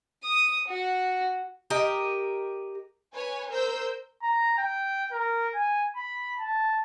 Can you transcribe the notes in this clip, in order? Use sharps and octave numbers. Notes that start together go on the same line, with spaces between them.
D#6
F#4
G4 A#4 D#5
B4 C#5 G#5
A#4 C5 E6 G6
A#5
G5
A#4
G#5
B5
A5